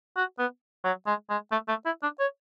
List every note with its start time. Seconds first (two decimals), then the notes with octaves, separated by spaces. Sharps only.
0.17 F#4
0.39 B3
0.84 F#3
1.07 G#3
1.30 G#3
1.52 A3
1.69 A3
1.86 E4
2.03 D4
2.20 C#5